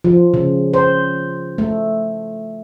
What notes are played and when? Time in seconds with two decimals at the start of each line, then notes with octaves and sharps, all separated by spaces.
0.04 F3
0.34 C#3
0.73 C5
1.58 A3